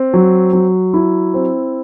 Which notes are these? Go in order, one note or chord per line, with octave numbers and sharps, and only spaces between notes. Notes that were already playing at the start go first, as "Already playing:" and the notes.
Already playing: C4
F#3
F#3
E4
C4